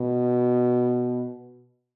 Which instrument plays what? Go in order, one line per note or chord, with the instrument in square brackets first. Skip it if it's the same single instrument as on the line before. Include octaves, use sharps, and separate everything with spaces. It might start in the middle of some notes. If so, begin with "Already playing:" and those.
Already playing: [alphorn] B2